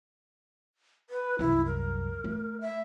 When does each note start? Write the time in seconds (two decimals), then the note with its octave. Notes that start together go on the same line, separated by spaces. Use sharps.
1.10 B4
1.39 C2 F#2 E4
1.66 A#4
2.24 A3
2.61 E5